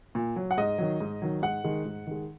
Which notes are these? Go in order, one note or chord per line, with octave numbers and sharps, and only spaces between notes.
A#2
F#3
F#5
G#2 D#5
D#3 F#3
G#2
D#3 F#3
G#2 F#5
D#3 G#3
G#2
D#3 G#3